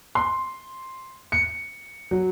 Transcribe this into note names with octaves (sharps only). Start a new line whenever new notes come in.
C6
C#7
F#3